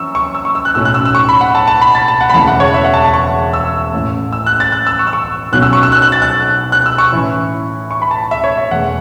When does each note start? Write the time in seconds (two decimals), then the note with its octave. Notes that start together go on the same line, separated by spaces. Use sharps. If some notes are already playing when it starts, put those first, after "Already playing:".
Already playing: F#2 E3 C#6 E6
0.15 C#6
0.35 E6
0.45 C#6
0.55 E6
0.65 F#6
0.75 B1 A2 F#3 A3 C#4 E6
0.85 F#6
0.94 E6
1.05 E6
1.15 C#6
1.29 B5
1.41 F#5
1.55 A5
1.68 A5
1.81 B5
1.95 A6
2.08 A5
2.21 F#5
2.30 B5
2.34 E1 E2 C#3 A3 E4 A5
2.48 F#5
2.60 C#5
2.74 E5
2.84 F#5
2.94 A5
3.04 A5
3.14 C#6
3.53 E6
3.93 A1 A2 A3
4.33 E6
4.46 F#6
4.60 A6
4.72 F#6
4.87 E6
4.99 C#6
5.07 E6
5.13 C#6
5.52 B1 B2 F#3 C#4 F#6
5.62 E6
5.73 C#6
5.83 E6
5.92 F#6
6.02 F#6
6.12 A6
6.22 F#6
6.72 F#6
6.86 E6
6.98 C#6
7.12 A2 E3 C#4 E4
7.91 C#6
8.02 B5
8.11 A5
8.31 E5
8.44 C#5
8.58 E5
8.71 E1 E2 E3 A3 F#5